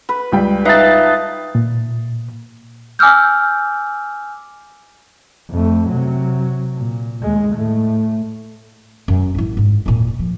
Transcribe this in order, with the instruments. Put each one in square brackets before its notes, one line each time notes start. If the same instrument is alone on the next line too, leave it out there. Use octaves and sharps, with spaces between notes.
[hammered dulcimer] B4
[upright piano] C#2 G3 G5
[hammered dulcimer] D#4 A5 [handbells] B4 E5 F5
[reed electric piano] A#2
[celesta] G#5 D6 E6 F6 G6
[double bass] F2 A3
C3 F#3
A#2
D#2 G#3
A2 A3
[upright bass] F#2
A1 E4
G#2
E2 A#2
F3